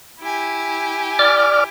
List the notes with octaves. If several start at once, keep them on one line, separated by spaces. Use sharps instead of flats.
E4 G4 G#5
D5 D6 F6